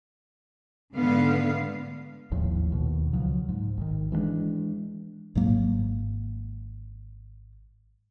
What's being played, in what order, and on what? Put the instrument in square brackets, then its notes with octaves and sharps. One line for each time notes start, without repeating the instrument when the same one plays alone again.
[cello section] G#2 D3 A3 B3 F5
[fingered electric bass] G#1 D#2 A2 F3
D#2 B2 D#3
C#2 C#3 F3 F#3
G#2
G#1 G#2 D#3
E3 G#3 B3 D4
[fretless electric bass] G#1 G#2 F#3 A#3